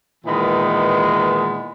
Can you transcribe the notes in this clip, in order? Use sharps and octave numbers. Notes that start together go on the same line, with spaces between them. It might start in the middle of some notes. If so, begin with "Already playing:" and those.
A#2 D#3 E3 G#3 B3